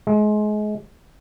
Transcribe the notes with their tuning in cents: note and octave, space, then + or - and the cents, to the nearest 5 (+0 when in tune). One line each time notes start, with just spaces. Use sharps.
G#3 +30